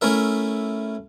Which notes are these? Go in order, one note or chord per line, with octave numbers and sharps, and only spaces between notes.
A3 C#4 E4 A#4 E5